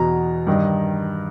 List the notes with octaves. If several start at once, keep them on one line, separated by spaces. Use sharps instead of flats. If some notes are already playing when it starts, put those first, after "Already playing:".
Already playing: E2 B2 A#5
G2 D#3